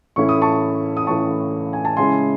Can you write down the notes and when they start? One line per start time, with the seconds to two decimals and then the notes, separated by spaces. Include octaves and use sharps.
0.16 A2 E3 A3 C#4 E4 C#6
0.29 D#6
0.42 A5 C#6
0.97 D#6
1.07 A2 E3 A3 C#4 E4 A5 C#6
1.73 G#5
1.85 A5
1.97 C#3 G#3 C#4 E4 G#5 C6